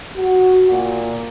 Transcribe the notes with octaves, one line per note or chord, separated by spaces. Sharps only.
F#4
A#2